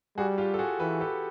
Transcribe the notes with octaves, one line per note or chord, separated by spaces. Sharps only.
G3 F#4 G#4
F4 G4
A4
F#4 G#4
E3 A4 B4
G4 A4